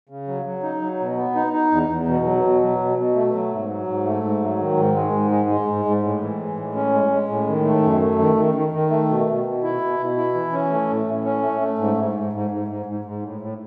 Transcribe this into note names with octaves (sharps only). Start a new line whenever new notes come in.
C#3
F#3
F#3
D#4
F#3
B2
B3
D#4
D#4
E2
E2
B2
F#3
B2
F#3
B2
B2
A3
F#3
G#2
F#3
G#2
A3
G#2
F#3
D#3
G#2
G#3
G#2
G#3
G#3
G#2
G#2
A2
E3
G#3
A2
C#4
G#3
G#3
A2
D#3
A3
F#2
A3
D#3
D#3
D#3
D#3
A3
B2
B2
B2
E4
B2
B2
E4
E3
C#4
A3
A2
A2
C#4
A3
A3
G#2
G#2
G#2
G#2
G#2
G#2
G#2
G#2
A2
A2